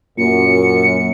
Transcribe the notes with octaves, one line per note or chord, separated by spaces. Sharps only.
F#2 A#2 C#7